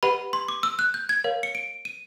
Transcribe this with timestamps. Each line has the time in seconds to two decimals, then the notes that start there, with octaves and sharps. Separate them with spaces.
0.03 G4 B4 D#5 F#5 B5
0.33 C6
0.48 D6
0.63 E6
0.79 F#6
0.94 G6
1.09 G#6
1.24 A#4 C#5 F5
1.43 C#7
1.55 D7
1.85 D#7